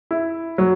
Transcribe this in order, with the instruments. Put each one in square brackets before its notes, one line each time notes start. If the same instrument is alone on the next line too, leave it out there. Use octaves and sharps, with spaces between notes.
[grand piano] E4
F#3